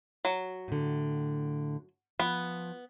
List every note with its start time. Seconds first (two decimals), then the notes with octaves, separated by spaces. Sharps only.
0.25 F#3
0.68 A2 D3
2.19 F3 B3 F4